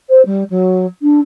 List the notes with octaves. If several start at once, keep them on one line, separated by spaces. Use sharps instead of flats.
C5
G3
F#3
D4